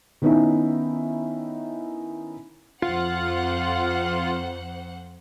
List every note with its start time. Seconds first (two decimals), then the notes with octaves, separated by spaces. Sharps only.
0.22 D#3 B3 C#4 D#4 E4
2.82 F2 F4 C5 F#5